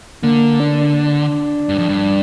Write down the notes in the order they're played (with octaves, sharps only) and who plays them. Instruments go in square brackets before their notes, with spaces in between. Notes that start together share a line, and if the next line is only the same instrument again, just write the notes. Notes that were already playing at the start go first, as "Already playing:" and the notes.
[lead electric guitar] D3 [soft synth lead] A#3
[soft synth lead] D4
[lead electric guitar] G2
F2
G2